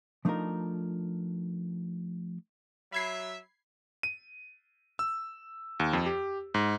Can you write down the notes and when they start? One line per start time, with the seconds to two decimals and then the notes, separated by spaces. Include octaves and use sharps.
0.25 F3 A3 D4 D#4 F4 A#4
2.92 F#3 E5 B5 G#6 C7
4.03 D#7
4.99 E6
5.80 D#2
5.93 F2
6.06 G4
6.54 G#2